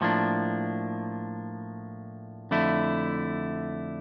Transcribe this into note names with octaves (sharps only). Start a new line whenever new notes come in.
A2 F3 A#3 D4
F2 D3 A3 E4